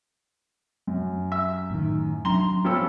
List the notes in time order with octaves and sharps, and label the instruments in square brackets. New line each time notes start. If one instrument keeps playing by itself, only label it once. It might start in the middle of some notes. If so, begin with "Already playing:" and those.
[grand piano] F#2
[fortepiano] E5
[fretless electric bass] A2 D#3
[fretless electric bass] F#3 C4 D4 [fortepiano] A#5 C6 [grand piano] G7
[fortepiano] G2 F3 A4 [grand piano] B3 C#4 F4